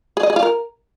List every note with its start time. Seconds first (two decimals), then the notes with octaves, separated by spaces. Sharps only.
0.17 G#4
0.23 D#5
0.30 G#4
0.36 F4
0.43 A#4